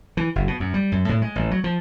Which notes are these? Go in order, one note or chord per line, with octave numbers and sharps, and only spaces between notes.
E3
F#1
B2
F#2
G3
F#2
A2
G#3
A1
F#3
F3